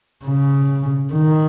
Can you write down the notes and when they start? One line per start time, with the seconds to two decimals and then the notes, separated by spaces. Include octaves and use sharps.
0.25 C#3
1.13 D#3